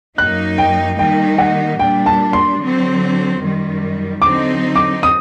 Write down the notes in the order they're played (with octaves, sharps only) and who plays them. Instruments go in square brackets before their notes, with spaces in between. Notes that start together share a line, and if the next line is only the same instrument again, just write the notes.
[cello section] F#2 F#3 A#3 D#4 [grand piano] F#6
[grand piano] G5
[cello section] D#3 G3 A#3 D#4 [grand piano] G5
[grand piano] F#5
[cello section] A#2 G3 D4 [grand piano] G5
[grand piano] A5
C6
[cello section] D3 F#3 C4
F#2 D#3 G3
[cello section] D3 F#3 C4 D#4 [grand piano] D6
[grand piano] D6
D#6